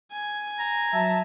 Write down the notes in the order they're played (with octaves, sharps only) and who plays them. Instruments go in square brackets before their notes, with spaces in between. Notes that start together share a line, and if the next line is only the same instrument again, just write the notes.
[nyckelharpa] G#5
[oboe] A#5
[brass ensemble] F#3 E5 A5